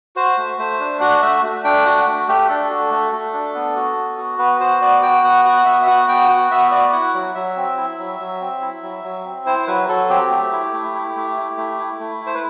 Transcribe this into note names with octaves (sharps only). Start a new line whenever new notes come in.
F#4 C5
A3
A3 C5
D4
F#4 F#5
A3 E5
A3
D4 G5
F#4 F#5
A3
A3 G4
D4 A4
F#4
A3
A3
D4
B3
F#4
B3
F#4
B3 B4
F#4 C5
B3 D5
F#4 G5
B3 F#5
F#4 F#5
B3 E5
E5
F#4 F#5
B3 G5
F#4 F#5
B3 E5
F#4 D5
E4 F#5
F#3
F#3 E5
C4
E4
F#3
F#3
C4
E4
F#3
F#3
C4
E4 C5
F#3 B4
F#3 A4
C4 G4
A3
E4
A3
E4
A3
E4
A3
E4
A3
E4
C5
B4